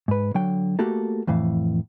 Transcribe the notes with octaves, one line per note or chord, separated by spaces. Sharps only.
G#2 B4
D3 F#3 G5
A3 A#3 F#4 G4 A4
F2 A2 E3 F5